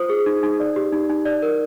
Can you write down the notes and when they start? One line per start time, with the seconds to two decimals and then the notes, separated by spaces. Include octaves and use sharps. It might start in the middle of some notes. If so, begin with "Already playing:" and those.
Already playing: F4 C5 D#6
0.10 G#4
0.26 D#4
0.43 D#4
0.60 D5
0.76 G4
0.93 D#4
1.10 D#4
1.26 D5
1.42 A#4